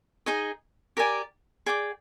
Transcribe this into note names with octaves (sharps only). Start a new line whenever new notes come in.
D#4 G#4 D#5 G#5
G4 A#4 D5 G#5
G#4 D5 G5 D6